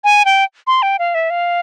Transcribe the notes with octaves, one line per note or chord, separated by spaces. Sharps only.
G#5
G5
C6
G5
F5
E5
F5